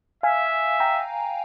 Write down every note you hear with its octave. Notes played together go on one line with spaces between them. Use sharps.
E5 F5 G#5
G5 A#5